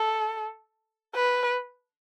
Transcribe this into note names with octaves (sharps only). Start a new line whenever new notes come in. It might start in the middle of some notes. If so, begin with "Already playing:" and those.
Already playing: A4
B4